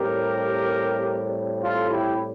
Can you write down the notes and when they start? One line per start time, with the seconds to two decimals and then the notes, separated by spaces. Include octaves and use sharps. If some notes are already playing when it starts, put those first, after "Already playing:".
Already playing: A2 G3 C4 G4 A#4
1.61 F4 A4
1.89 E4 G4